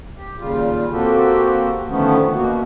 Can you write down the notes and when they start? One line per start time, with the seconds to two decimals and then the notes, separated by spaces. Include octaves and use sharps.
0.16 G4
0.40 D#2 A#2 C#3 G3 F4
0.92 A#3 C4 F#4 G4 A4
1.88 D3 D#3 F3 A3 B3 C#4
2.34 B2 A#3 F#4